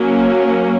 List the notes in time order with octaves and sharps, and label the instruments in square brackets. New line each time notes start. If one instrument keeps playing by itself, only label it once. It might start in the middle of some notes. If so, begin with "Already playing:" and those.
Already playing: [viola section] F#3 A#3 C#4